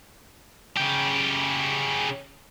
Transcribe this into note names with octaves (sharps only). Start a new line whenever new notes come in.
C#3 G4